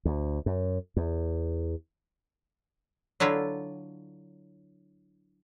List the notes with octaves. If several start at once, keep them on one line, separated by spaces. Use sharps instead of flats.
D2
F#2
E2
D3 F#3 E4 F4